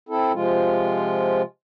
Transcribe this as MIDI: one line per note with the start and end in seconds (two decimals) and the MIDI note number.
0.09 0.32 60
0.09 0.32 64
0.09 0.32 69
0.33 1.42 48
0.33 1.42 53
0.33 1.42 56
0.33 1.42 65